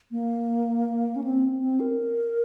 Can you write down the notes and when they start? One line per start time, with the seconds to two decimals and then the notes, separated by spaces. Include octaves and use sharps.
0.11 A#3
1.16 C#4
1.24 C4
1.61 C4
1.80 A#4